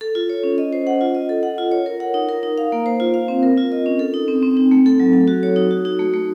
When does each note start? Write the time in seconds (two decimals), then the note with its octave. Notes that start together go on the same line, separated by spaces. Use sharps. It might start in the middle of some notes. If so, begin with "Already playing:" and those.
0.01 A4
0.15 F4
0.30 C#5
0.43 C#4
0.58 D#5
0.73 C5
0.87 F#5
1.01 F4
1.15 D#5
1.29 A4
1.43 F#5
1.58 F4
1.72 C#5
1.86 A#4
2.00 F#5
2.14 D#4
2.29 A#4
2.43 D#4
2.58 F5
2.72 A#3
2.86 C5
3.00 F4
3.14 F5
3.28 C4
3.43 A#4
3.57 F4
3.72 D#5
3.86 C#4
3.99 A4
4.14 D#4
4.28 C4
4.42 C4
4.57 D#4
4.71 A3
4.86 A4
5.00 F#3
5.13 A4
5.28 F#4
5.43 C#5
5.56 D#4
5.71 F#4
5.85 D#4
5.99 A3
6.14 A3